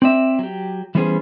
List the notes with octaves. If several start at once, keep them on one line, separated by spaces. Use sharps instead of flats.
C4 D5 E5
F#3 G4
E3 G3 B3 C#4 G#4 C5